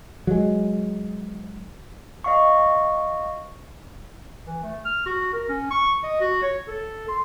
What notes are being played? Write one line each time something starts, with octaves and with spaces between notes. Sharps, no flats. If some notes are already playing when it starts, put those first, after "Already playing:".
F#3 G#3
D#5 F5 C#6
E3
A3
F6
F#4
A#4
C#4
C#6
D#5
F#4
C#5
A4
C6